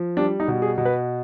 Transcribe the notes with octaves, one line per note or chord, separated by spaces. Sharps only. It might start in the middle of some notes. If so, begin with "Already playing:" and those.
Already playing: F3
G3 D4
D#4
B2
G#4
B2
B4